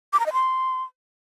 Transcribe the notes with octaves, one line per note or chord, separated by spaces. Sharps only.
D6
A#5
D#5
C6